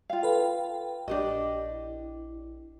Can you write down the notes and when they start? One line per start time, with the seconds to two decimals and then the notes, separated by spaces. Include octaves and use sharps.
0.10 F4 F5 G5
0.23 A4 B4
1.08 A#1 D4 G4 D#5
1.70 E4